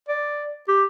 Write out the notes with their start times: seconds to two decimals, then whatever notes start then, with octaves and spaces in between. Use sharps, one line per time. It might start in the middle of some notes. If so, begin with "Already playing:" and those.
0.09 D5
0.68 G4